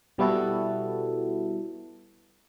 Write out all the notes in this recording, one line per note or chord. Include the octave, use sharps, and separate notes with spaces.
B2 G3 B3 E4 F#4 A4